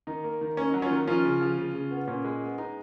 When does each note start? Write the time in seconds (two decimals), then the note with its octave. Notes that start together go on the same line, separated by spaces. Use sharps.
0.07 D#3 D#4
0.24 A#3
0.41 D#3
0.57 A#3 C#4
0.69 F#3 D#4
0.82 C#4 F4
0.91 D#3
1.07 F3 C#4 F4
1.25 C#3
1.41 F3
1.58 C#3
1.75 C#3
1.91 B3
2.07 A#2 C#4
2.25 G#3
2.42 B3
2.58 G#3 D#4